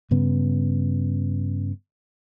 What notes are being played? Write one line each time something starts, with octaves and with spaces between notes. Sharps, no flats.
G2 C#3 B3